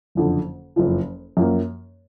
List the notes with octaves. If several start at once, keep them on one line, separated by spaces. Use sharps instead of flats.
F#1 F2 D3
F#1 F2 F3
F#2 F3 A#3